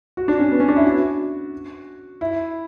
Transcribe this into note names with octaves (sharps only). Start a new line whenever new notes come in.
F#4
D4
C#4
B3
C#4
D4
E4
F#4
E4